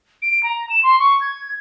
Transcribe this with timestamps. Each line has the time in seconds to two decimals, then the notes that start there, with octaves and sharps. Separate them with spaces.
0.22 D7
0.43 A#5
0.70 E7
0.83 C6
0.99 C#6
1.21 G#6